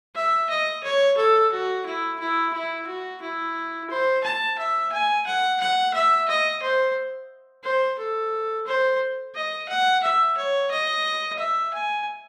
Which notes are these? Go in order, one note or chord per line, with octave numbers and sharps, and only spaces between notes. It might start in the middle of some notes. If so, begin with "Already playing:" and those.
E5
D#5
C#5
A4
F#4
E4
E4
E4
F#4
E4
C5
A5
E5
G#5
F#5
F#5
E5
D#5
C5
C5
A4
C5
D#5
F#5
E5
C#5
D#5
E5
G#5